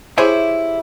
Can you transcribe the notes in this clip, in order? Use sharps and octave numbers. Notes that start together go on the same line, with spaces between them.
E4 G4 G#4 C5 C#5 E5